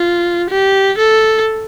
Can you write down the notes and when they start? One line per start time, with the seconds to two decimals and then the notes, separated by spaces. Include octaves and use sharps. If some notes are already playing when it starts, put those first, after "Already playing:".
Already playing: F4
0.50 G4
0.98 A4